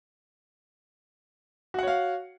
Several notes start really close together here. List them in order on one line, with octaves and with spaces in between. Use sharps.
F#4 F#5 C#5 F5